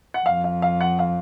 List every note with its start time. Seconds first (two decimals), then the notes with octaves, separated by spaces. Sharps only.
0.14 F#5
0.26 F2 F5
0.44 F5
0.62 F5
0.81 F#5
0.99 F5